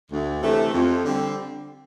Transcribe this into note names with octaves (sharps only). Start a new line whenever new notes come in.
D2
C3 E3 A3
F2
D3 G3 C4